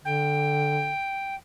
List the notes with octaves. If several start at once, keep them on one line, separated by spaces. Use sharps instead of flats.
D3 G5